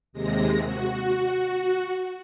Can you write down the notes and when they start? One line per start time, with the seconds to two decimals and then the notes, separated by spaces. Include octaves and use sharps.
0.13 D#2 C3 G#3 A#6
0.61 F#4